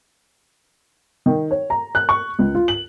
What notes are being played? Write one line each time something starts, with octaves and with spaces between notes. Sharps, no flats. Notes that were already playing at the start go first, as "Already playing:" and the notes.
D#3
C#5
A#5
F#6
C#6
C#2
F4
F#7